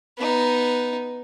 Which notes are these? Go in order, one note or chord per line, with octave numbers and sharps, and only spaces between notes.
B3 D#4